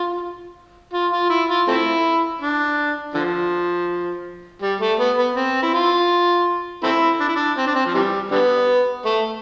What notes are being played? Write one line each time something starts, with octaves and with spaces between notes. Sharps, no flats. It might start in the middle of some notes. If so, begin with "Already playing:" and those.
Already playing: F4
F4
F4
E4
F4
A3 C4 E4
D4
D3 F3
G3
A3
B3
B3
C4
E4
F4
A3 C4 E4
D4
E4
D4
C4
D4
C4
F3
C3 E3 G3
D3 G3 B3
A3